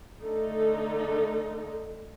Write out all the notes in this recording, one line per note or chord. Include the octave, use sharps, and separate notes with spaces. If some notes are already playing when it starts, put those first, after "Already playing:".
D3 A3 D#4 A4